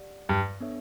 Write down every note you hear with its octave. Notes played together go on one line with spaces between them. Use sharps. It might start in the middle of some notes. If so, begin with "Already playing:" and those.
Already playing: G4 D5 F#5
G2
B3 D4 A4 C#5 E5